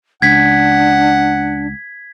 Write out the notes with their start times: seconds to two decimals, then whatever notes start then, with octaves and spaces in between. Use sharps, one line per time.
0.22 C#2 D4 F#5 G#6 B6